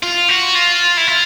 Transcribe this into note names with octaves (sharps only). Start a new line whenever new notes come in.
F4
F#4
F4
E4
F4